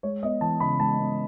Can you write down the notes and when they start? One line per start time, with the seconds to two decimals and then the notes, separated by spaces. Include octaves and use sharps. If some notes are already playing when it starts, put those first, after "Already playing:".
0.03 G#3 C#5
0.23 B3 D#5
0.41 E3 A5
0.60 C#3 B5
0.80 G#3 A5
0.99 B3